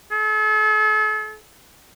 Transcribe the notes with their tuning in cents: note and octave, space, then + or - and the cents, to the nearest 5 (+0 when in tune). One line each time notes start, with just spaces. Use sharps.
A4 -45